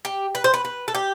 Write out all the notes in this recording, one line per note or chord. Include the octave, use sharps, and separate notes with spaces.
G4
B4
C5
B4
B4
A4
G4